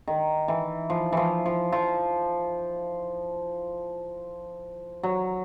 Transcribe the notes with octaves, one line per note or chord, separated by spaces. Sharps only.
D#3
E3
F3
E3 F3
F3
F3
F#3